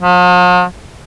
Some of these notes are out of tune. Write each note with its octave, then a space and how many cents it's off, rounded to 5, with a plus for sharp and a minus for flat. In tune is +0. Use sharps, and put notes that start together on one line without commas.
F3 +45